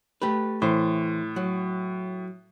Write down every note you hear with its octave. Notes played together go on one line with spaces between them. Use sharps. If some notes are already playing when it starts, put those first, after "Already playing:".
A3 G4 B4
A2 E3 C5
F#3